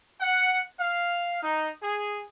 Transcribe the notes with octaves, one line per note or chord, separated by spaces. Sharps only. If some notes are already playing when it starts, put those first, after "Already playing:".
F#5
F5
D#4
G#4